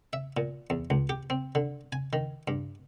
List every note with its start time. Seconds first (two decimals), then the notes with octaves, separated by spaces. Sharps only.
0.13 E5
0.37 A#2
0.70 E2
0.90 C#2
1.09 G4
1.30 C4
1.55 D3
1.92 G#5
2.13 D#3
2.48 G2